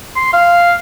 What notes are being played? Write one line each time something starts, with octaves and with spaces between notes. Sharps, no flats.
C6
F5